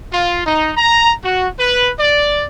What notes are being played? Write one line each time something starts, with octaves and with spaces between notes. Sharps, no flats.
F4
D#4
A#5
F#4
B4
D5